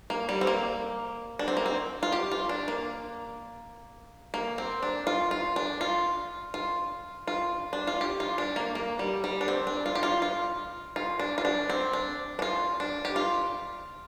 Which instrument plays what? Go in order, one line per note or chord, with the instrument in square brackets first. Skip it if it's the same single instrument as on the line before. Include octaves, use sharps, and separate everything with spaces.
[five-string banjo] A#3
G3
C4
A#3
D4
C4
A#3
C4
F4
G4
F4
D4
A#3
A#3
C4
D4
F4
F4
D4
F4
F4
F4
D4
F4
G4
F4
D4
A#3
A#3
G3
G3
D4
C4
D4
F4
G4
F4
F4
F4
D4
F4
D4
C4
D4
D4
F4
D4
G4
F4